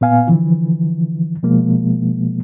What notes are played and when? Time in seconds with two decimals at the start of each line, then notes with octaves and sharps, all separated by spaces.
0.01 A#2 B3 F5 G#5
0.27 D3 E3 F3
1.43 B2 F3 G#3 A#3